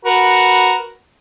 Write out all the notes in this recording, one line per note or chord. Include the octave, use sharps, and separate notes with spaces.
F#4 A#4 B4